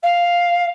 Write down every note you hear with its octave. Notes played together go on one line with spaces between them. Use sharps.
F5